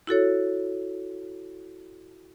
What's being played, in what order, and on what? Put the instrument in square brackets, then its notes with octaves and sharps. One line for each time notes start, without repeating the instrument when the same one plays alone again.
[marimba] E4 F#4 A4 C#5